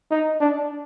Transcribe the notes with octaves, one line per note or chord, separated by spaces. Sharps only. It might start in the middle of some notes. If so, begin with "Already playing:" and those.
D#4
D4